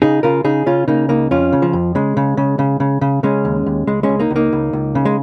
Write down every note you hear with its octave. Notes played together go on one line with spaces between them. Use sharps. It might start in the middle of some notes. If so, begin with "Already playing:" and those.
C#3 D#4 G#4
C#3 F4 A#4
C#3 D#4 G#4
C#3 C#4 F4
C#3 A#3 D#4
C#2 A#3 D#4
F2 C#4 F4
C#3
F3
F2
C#3 G#3
C#3
C#3
C#3
C#3
C#3
C#3 G#3 C#4
D#2
D#2
C#2 G#3
G#3 C#4
C#2
A#3 D#4
C#2
A#3 D#4
C#2
C#2
C#3
G#3